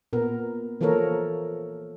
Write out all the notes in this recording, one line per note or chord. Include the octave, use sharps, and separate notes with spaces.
A#2 B3 A#4
E3 F3 A#3 A4 A#4 C#5